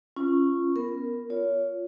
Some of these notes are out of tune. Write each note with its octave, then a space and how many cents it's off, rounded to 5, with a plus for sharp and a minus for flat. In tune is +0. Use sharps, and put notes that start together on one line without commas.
C#4 -10 F4 -25
B3 +0 A#4 +0
F4 +0 C#5 +25